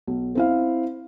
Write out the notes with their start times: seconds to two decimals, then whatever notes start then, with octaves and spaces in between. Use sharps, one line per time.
0.07 B1
0.35 C4 E4 F5